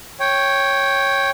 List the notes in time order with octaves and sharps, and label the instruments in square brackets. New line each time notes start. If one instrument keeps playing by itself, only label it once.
[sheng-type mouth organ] C#5 G5